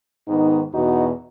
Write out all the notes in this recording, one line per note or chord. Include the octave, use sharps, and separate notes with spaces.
G#2 D#3 B3 D#4
E2 B2 D#4 F#4